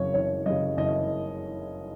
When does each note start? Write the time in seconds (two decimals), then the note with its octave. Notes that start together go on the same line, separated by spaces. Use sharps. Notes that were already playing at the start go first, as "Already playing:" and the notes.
Already playing: F#1 F#2 C#3 C#5
0.14 F#1 C#5
0.46 F#2 C#3 D#5
0.77 F#1 D#5